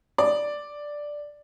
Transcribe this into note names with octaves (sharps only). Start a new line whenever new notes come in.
D5